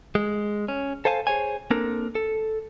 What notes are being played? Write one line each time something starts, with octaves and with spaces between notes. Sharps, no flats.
G#3
C#4
A4 C5 F5 G#5 A5
G#4 C5 C#5 G#5
A#3 C4 D4 A4 A#4
A4